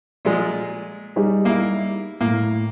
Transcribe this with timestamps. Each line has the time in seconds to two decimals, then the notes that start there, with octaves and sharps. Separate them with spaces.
0.25 A#2 F3 G#3
1.16 G3 D#4 G#4
1.45 A#3 E4
2.21 A2 A#3